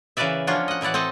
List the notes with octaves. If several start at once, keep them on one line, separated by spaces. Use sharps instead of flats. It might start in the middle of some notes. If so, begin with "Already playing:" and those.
C#3 E3 A#4 B4 D5 E5
F3 A#3 C#4 D4 F4 F#4
D#5 F#5
A2 E3 E4 D5 F#5
C4 A4 D#5 A5